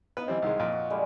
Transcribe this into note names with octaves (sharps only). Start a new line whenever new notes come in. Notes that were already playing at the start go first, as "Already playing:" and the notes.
B3 D#4 B4 F5
E3 G3 C4
C2 D#3 G#3
F2 A#2
F#4
D3 G3 G#3